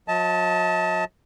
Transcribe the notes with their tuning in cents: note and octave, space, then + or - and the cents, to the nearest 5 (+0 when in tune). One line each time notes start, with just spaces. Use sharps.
F#3 -45 D#5 +40 A5 +0